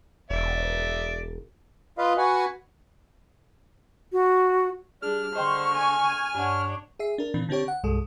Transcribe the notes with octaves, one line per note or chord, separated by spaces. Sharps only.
E1 D5 E5
F4 B4 D#5 F5
F#4 B4 F#5 G#5
F#4
G3 D4 G#4 F6
D3 C5 D#5 G5 C6 C#6
G#5
G2 D4 C#5 F#5
G#4 E5 C7
D4 A#4
A#2 D#3 E3 C4 D4
D3 C4 D4 G4 C#5
F#5
C2 G2 G#3 A4